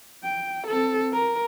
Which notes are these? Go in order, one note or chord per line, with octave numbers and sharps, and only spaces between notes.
G5
C4 A4
A#4